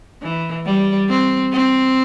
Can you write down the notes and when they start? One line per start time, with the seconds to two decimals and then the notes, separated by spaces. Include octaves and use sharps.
0.22 E3
0.66 G3
1.09 C4
1.52 C4